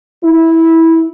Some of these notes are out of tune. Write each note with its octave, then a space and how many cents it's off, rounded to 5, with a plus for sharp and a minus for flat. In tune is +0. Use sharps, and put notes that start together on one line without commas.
E4 -15